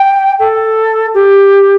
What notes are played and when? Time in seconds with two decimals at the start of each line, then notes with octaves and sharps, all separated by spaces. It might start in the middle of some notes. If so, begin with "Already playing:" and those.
Already playing: G5
0.39 A4
1.14 G4